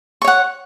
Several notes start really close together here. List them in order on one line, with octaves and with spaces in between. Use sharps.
C#6 C#5 F#5